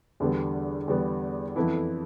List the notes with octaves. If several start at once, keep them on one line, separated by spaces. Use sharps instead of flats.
E2 D3 G3 B3
E2 D3 G3 B3
F2 E3 B3 E4 A4